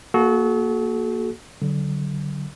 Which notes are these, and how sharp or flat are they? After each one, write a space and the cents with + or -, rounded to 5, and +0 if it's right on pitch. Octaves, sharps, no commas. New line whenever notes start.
A#3 +0 F#4 +5 A4 -40
D3 -15 F#3 +25